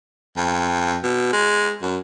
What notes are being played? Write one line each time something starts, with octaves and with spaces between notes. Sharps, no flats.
F2
B2
G#3
F#2